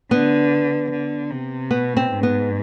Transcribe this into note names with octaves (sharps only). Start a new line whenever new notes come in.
D3 B3
D3
C3
B2 B3
C4
G#2
B3